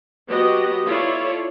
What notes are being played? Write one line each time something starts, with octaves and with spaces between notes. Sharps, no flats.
F#3 B3 F#4 G4 D#5
E4 F4 A4 C#5 D5